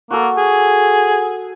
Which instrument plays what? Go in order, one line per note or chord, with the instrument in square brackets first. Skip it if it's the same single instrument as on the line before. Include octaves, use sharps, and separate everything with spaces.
[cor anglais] A#3 [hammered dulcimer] F#4 A4
[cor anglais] G#4